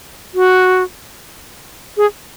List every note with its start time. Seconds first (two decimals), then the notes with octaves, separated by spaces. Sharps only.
0.34 F#4
1.97 G#4